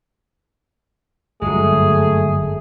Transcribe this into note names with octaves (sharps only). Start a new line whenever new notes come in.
G1 F#2 F#3 G#3 A3 G#4